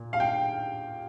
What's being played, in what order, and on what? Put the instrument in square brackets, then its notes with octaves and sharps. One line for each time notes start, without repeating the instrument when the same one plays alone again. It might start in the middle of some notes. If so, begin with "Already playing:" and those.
Already playing: [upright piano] A#2
F5
G5